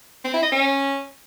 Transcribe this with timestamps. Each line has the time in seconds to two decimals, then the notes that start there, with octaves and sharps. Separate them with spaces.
0.24 C4
0.34 E4
0.43 D#5
0.52 C#4